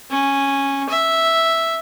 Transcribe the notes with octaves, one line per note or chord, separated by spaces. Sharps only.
C#4
E5